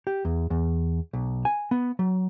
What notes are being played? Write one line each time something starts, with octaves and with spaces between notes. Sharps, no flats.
G4
E2
E2
B1
G#5
B3
F#3